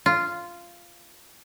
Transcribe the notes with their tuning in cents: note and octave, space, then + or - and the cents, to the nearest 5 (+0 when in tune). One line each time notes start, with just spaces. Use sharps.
F4 -10